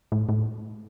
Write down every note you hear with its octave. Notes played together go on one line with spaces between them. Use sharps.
A2
A2